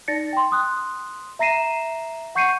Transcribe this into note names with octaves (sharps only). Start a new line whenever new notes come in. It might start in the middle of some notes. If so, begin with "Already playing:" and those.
D#4 D5 A6 A#6 C#7
G5 C6
C6 D#6 F#6
E5 A#5 A#6 C7 D#7 E7
F#5 C#6 G6 C7 C#7 D#7